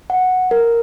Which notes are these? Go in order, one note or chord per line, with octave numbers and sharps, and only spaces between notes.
F#5
A#4